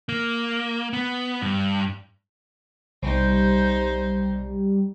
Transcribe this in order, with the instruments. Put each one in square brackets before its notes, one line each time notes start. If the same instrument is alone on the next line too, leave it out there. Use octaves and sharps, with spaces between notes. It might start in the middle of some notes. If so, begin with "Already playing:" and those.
[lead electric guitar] A#3
B3
G2
[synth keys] B1 C3 [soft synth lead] G3 [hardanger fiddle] D#4 C5